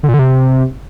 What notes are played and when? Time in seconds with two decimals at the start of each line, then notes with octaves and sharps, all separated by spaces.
0.03 D3
0.09 A#2
0.14 D3
0.19 C3